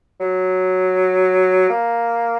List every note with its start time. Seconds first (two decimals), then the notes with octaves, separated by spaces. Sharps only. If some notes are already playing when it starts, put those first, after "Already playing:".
0.20 F#3
1.69 A#3